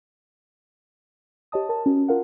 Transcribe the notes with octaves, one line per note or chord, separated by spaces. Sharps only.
G4 C#5 D#5 A5 D#6
A#4 A5
C#4 F#4
F4 A#4 F5 F#5